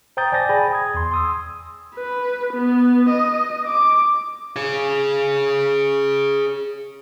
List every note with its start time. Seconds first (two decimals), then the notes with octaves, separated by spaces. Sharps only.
0.17 C5 G5 A#5 D#6 G6 A6
0.32 D5 G#5 A5 A6 A#6
0.49 G#4 G5 G#5 B5
0.73 D#6 G#6
0.94 E2 C6
1.11 C6 D#6 E6
1.95 B4
2.53 B3
3.09 D#5
3.67 D6
4.56 G#4 C#5